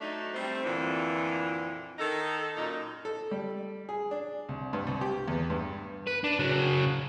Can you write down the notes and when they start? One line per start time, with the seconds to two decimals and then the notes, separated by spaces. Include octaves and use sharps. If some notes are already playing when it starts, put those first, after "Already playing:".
0.01 F#3 A3 D4 D#4
0.34 G3 A3 C4
0.64 F2 A#2 D3 E3
1.99 D#3 D#4 A4
2.56 F#2 A#2 D#4
3.05 A4
3.31 G3
3.89 G#4
4.11 D4
4.49 C2
4.73 G2
4.87 C2
5.01 G4
5.28 E2
5.50 G2
6.07 B4
6.24 D4
6.39 C#3 F#3